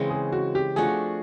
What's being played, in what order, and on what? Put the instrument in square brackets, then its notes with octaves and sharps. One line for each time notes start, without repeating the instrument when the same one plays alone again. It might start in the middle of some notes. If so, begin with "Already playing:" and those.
Already playing: [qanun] C#3 E3 G#3 C4
[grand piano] G#4
F#4
G4
[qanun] F3 A3 D4 F#4 [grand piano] G#4